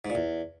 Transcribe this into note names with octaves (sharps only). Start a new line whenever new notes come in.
G#2
A#2
E2